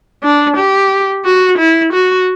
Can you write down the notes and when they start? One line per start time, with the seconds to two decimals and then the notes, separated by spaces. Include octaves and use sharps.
0.23 D4
0.57 G4
1.25 F#4
1.58 E4
1.93 F#4